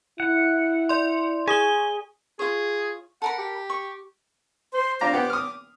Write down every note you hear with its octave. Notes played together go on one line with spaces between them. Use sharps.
E4 F#5
D5 C6
G#4 G#5 D#6 G7
F4 G#4 C#5
A4 A#4 F#5 B5
G4
C#6
C5 C6
D4 F4 A#5 D6
B3 G4 F#5
D#6 F6